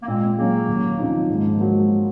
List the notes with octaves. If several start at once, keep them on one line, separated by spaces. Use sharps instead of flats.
A#3
A#2 G#3 C4
F#3 G#3 A#3 C#4
D#2
C#3 F3 C4 D#4
G#2 F3 G#3
F#3 A#3